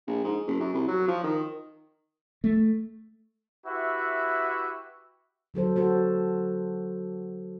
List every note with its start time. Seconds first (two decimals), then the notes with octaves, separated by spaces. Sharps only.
0.07 A#1
0.24 G#2
0.47 F#1
0.60 F#2
0.74 C2
0.88 F#3
1.08 F3
1.23 D#3
2.44 A3
3.67 E4 F#4 G4 B4 E5
5.54 D3 F#3 A4 C5
5.76 F#4 A4 C5